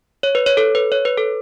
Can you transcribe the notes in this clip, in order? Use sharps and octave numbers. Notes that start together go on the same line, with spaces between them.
C#5
B4
C#5
A4
B4
C#5
B4
A4